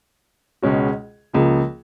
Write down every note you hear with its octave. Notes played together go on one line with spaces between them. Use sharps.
C#2 B2 G#3 C#4 F#4
C#2 C#3 F3 A#3